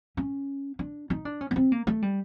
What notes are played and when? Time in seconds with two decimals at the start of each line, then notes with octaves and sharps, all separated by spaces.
0.17 C#4
0.79 D4
1.10 D#4
1.25 D4
1.41 C#4
1.51 B3
1.56 C4
1.72 A#3
1.87 A3
2.02 G3